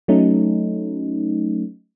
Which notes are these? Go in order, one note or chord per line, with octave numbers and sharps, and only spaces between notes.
F#3 A3 C#4 D#4